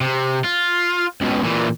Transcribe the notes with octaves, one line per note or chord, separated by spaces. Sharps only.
C3
F4
C#2 B2
A#2 E3